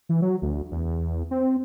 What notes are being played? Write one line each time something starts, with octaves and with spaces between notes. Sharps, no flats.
E3
F#3
D2
E2
C4